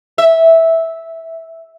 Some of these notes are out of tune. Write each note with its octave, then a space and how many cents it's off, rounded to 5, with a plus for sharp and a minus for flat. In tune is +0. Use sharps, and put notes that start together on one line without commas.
E5 -10